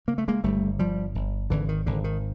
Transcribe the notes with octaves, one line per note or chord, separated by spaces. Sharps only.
C#3 A#3
A3
G#3 A#3
G1 G3 A3
G1 F3 G3
G1
G#1 D3 E3
D#3
G#1 D3
D#3